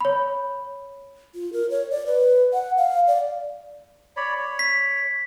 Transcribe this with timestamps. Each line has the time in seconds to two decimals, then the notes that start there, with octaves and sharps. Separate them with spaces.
0.01 C#5 B5
1.34 F4
1.53 A#4
1.70 C#5
1.91 D5
2.06 B4
2.53 F#5
2.77 F5
3.07 D5
4.17 C#5 D5 B5
4.36 C#5
4.59 B6